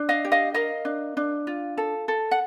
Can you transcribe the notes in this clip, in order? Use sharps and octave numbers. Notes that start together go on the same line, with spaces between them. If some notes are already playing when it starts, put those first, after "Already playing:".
Already playing: D4
D#5 F5
G4
D#5 F5
A#4 D#5 F5
D4
D4
F4
A4
A4
F#5